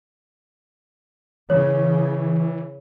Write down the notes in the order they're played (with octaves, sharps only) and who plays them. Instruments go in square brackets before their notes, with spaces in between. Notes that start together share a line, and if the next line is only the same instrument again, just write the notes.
[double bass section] C#3 [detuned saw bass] E3 [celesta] C#5